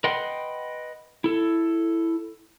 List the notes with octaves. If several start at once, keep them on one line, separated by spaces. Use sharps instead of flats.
B4 D#5 F#5 G5 C6
E4 A4